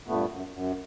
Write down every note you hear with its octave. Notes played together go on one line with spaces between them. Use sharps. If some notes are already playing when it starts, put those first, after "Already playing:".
G2 A#2 A3 B3
F#2
F#2